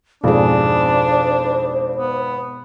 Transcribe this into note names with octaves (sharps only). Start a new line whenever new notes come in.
G#1 F2 B2 D4 G#4 C5
B3